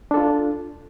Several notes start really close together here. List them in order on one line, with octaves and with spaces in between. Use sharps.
D4 A4 F4